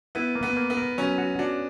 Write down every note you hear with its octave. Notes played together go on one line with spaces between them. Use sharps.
B3 E4
A#3
B3
A#3
B3
A#4
F#3 C#4
F#4
D4 F#4